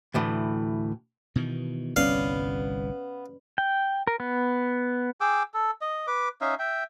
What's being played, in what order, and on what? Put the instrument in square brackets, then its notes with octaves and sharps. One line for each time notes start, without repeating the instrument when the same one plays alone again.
[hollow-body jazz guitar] D2 A2 E3
[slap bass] B2 D#3 E3
[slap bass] G1 C2 G2 [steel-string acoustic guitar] B3 [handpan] C#4 D5 [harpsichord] F5
[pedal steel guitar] G5
A#4
B3
[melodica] G#4 G5 D6 E6
A4
D#5
B4 D6
C#4 D#4 E5 F5
E5 G5